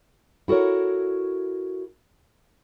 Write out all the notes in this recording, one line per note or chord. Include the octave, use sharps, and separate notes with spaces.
E4 F#4 A4 A#4 C#5